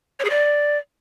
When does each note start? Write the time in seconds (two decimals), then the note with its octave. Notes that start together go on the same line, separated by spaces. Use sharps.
0.20 C#5
0.25 G#4
0.30 D5